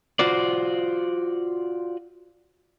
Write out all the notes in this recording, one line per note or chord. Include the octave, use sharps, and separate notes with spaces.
F4 F#4 C5 D5